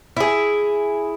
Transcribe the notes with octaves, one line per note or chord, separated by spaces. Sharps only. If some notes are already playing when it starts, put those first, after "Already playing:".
E4 G#4